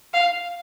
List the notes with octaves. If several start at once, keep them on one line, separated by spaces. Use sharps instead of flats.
F5